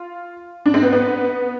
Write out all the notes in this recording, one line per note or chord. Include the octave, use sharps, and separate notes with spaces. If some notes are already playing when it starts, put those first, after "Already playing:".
Already playing: F4
D4
C4
B3
B3